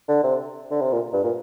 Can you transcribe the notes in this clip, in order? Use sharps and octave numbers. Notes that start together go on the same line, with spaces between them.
D3
C3
D3
C3
A#2
G2
A#2